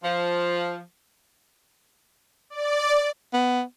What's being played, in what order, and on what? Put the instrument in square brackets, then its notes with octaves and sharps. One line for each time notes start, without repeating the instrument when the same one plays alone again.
[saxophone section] F3
[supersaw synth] D5
[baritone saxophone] B3